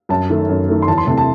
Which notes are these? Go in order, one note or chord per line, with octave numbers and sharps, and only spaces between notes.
F#2 A5
D#3 A3
F#2
D#3 A3
C6
E2 A5
C6
C3 E3 A3 A5
A5